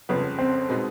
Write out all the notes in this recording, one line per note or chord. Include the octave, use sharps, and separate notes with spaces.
G1 F2 C#3 F3 B3
C4
B2 G#3 B3 D#4